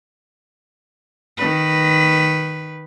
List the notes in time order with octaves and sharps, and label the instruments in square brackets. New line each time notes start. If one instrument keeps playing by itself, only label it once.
[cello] D#3 B4